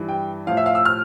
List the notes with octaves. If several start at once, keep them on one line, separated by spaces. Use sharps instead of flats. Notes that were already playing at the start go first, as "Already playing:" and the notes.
Already playing: G2 E3 G3
G5
A2 F3 F5
E5
F5
E6
F6